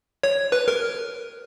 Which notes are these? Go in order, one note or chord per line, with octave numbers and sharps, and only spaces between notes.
C#5
B4
A#4